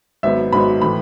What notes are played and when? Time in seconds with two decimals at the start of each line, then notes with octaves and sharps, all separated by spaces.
0.23 G#1 G#2 F#3 B3 E5
0.53 G#1 G#2 F#3 B3 B5
0.82 A2 E3 A3 B5